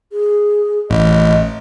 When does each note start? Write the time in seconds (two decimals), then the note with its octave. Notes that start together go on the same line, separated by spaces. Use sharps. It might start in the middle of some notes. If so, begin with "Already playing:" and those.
0.12 G#4
0.90 A1 D#5